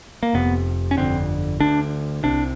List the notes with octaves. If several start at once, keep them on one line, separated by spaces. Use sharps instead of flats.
A#3
F1 F2 C3 B3
C#4
G1 F2 D3 C4
D2 D3 D4
C2 C3 D4